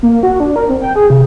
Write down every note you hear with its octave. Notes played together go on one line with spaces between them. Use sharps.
A#3
F#4
D4
A#4
C4
G5
G#4
C3